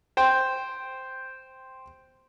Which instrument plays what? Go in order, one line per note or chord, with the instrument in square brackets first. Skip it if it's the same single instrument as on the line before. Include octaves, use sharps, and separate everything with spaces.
[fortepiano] C5 G5